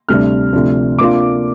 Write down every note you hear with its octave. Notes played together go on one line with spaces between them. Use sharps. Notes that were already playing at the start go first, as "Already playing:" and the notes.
D2 C3 G3 D4 F6
D2 C3 F3 D4
C3 A#3 D4 F4 D6